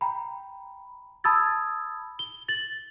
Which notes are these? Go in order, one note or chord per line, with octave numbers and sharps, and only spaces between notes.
G5 A#5 B5
A5 B5 D#6 E6 G#6 A6
G7
A6 F#7